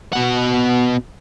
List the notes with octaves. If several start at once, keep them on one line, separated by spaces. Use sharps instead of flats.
B2 F#5